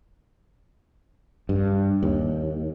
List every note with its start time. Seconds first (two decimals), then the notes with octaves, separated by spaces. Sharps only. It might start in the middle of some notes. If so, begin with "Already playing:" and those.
1.49 G2
2.03 D#2